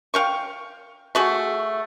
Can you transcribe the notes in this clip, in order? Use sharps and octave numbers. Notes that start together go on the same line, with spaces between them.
F5 G5 C#6
A3 F#4 G#4